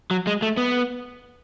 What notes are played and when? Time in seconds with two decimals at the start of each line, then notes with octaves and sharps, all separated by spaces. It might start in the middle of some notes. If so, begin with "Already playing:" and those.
0.11 F#3
0.27 G#3
0.42 A3
0.57 B3